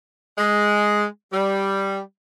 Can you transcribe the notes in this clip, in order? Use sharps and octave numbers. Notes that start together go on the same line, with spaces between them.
G#3
G3